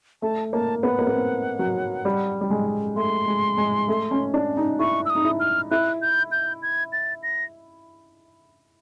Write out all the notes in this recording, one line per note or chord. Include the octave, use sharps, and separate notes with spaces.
A3 A5
A#3 A5
B3 F#5
A#3
B3
C4
F#3
G3
G3
G#3
A3 C6
G#3
G#3
A3
C#4
D4
D#4
E4 C#6
E6
D#6
D#4
E4
F6
E4 F#6
G6
G6
G#6
A6
A#6